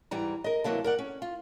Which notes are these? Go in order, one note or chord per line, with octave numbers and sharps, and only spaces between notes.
G#2 E3 G3 A#5
A#4 D#5
D2 C3 E3 F#3 A#3 A5
A#4 D5 F#5
C#4
F4